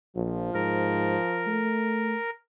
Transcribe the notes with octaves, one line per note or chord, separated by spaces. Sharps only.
A#1 F3
G#2 A#4
A3